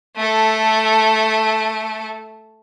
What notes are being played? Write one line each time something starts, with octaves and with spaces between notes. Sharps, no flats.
A3 A4